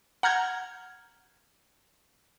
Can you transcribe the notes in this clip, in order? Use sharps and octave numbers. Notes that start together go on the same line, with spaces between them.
F#5 A#5 F6 G6 G#6